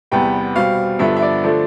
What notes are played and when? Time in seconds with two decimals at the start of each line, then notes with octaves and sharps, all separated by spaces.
0.11 E2 C3 G3 B3 G5
0.55 B2 G3 C4 F5
0.99 G2 D3 F3 B3 D4 E5
1.16 E5
1.22 D5
1.44 D3 F3 A3 D4